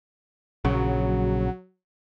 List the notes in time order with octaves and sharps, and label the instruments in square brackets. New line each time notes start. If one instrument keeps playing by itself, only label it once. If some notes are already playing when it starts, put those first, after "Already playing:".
[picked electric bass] A#1 C#3 [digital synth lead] F#3